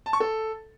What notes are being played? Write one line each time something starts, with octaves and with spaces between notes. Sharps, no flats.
A5
C#6
A4